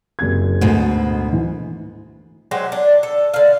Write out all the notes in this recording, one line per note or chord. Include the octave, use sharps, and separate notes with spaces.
F#1 C3 G#6
D2 G#2 B2
E3
F#3 G#3 G4 C5
D4
A4
D3 F5